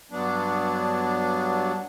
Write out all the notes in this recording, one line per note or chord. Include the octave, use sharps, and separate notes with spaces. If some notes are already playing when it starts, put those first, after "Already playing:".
G2 F#3 B3 D4